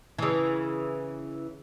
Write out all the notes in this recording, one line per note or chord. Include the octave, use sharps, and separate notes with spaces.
C#3 E3